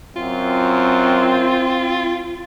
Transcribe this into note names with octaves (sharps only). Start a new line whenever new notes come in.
F#2 C4 F4